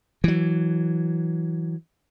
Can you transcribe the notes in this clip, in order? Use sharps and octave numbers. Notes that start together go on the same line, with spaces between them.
E3 F#3